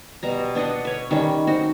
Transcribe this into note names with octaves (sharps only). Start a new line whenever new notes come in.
B2 G3 A#5
B3 D4 D#5 F#5
B4 C#5
D#3 G3 C#4
C4 D#4 F#4